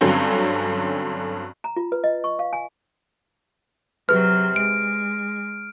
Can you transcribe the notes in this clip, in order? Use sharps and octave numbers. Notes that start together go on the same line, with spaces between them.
G2 D3 F#3 C4 C#4
A#5
F4
B4
D#5
C#6
F5
G#5
C3 F#3 G#4 B4 F6
G#3 D7